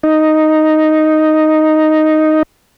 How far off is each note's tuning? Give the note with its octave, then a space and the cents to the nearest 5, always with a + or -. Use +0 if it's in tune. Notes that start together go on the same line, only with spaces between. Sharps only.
D#4 +0